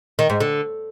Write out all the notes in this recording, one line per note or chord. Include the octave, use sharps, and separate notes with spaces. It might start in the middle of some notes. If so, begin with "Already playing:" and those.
D#3
G#2
D3